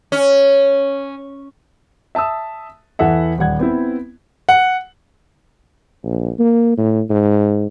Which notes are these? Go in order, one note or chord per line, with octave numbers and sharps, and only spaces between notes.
C#4
E5 A5 D#6 E6
E2 E3 A4 E5 F#5
D#1 G3 F#5 G#6
B3 C4 E4
F#5
A#1
A#3
A2
G#2